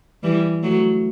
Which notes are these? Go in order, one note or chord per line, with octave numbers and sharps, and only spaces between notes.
E3 G3
F#3 A3